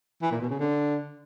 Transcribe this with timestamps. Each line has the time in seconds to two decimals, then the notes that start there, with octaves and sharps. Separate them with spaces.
0.22 E3
0.31 A#2
0.41 B2
0.50 C#3
0.59 D3